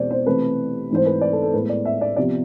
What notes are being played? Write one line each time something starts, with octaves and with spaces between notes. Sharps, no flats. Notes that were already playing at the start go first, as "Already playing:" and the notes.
Already playing: E2 B2 G#3 C4 C5 D5
C5
C3 E3 A3 C4 B4
G#2 E3 A3 C4 C5
B4
D5
A4
A4
A2 G#3 B3 B4
D5
E5
D5
C3 F3 B3 D5